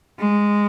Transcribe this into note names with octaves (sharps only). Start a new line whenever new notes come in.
G#3